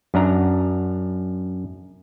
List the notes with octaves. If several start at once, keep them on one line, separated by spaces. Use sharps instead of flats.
F#2 D4 A#5